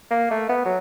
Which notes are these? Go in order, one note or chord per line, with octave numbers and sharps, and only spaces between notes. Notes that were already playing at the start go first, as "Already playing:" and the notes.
A#3
A3
B3
F#3